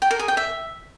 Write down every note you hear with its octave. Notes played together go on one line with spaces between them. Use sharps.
G5
A#4
G#4
G5
E5